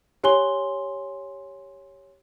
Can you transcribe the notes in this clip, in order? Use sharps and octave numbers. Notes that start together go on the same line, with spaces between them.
G4 C#5 G#5 C6 G7